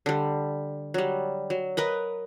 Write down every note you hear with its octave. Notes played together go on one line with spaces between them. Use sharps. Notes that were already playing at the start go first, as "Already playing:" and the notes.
D3 G3
F#3 G3
F#3
A#4 B4 D#5